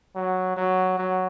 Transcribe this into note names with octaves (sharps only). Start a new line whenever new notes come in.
F#3
F#3
F#3